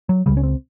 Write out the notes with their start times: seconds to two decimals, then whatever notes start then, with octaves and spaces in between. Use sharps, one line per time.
0.09 F#3
0.26 C#2 C#3 G3
0.37 C#4
0.43 C4